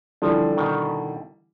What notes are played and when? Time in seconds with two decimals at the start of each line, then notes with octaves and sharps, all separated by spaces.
0.22 D3 E3 F3 G3
0.57 B2 D#3